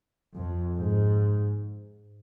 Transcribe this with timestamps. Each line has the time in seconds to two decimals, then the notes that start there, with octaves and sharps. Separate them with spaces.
0.35 F2
0.77 G#2